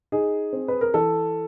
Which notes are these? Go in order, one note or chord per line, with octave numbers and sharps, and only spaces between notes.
D#4 G#4
C4
B4
A#4
E3 A4